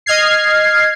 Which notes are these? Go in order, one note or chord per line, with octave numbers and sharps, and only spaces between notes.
D#5 F6 G#6 C7